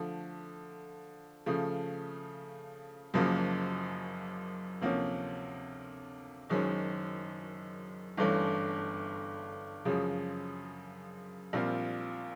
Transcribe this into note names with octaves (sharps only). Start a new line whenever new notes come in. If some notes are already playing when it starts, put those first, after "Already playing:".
Already playing: D3 F3 A3
C#3 F3 A3
F#1 F#2 C#3 F3 A#3
D2 C3 F3 A#3 C#4
F#1 F#2 D#3 G#3 C#4
G1 G2 E3 A3 C#4
F#2 C#3 F3 G#3 C#4
A#1 A#2 G3 C4 F4